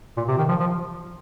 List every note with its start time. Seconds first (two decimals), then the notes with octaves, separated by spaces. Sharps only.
0.17 A#2
0.28 C3
0.38 D#3
0.49 F3
0.60 F3